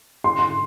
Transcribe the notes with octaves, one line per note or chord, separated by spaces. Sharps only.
C6
C6